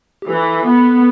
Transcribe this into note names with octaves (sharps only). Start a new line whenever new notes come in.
G4
E3 A4
B3